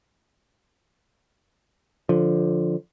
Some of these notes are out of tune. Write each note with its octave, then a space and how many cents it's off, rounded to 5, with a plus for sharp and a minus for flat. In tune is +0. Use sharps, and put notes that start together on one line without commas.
D3 +0 F3 +10